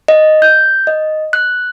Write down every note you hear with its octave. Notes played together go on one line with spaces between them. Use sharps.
D#5
G6
D#5
F#6